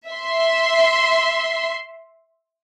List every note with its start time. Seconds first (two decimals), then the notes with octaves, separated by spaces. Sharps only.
0.11 E5 C6